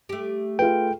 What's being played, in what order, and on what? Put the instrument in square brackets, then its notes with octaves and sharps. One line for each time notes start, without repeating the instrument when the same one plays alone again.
[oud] A3 G4
[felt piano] F4 G#4 B4 [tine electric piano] G5